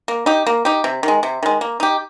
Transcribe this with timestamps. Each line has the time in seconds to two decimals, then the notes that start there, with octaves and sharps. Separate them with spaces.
0.08 A#3
0.26 D#4 G4
0.47 A#3
0.65 D#4 G4
0.84 C3
1.03 D#3 G#3
1.23 C3
1.43 D#3 G#3
1.61 A#3
1.80 D#4 G4